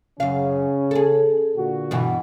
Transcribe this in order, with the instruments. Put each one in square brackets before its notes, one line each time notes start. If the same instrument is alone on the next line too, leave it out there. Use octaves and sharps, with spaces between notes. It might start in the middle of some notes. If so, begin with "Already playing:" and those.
[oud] F#2 F5 [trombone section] C#3 C#4
[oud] G#4 A4
[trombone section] A#2 D3 F#4
[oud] G2 B2 E3